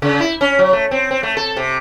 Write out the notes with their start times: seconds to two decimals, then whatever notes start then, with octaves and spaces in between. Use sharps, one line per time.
0.02 C#3
0.20 E4
0.41 C#4
0.59 F#3
0.73 A3
0.91 C4
1.11 C4
1.23 A3
1.37 A4
1.57 C3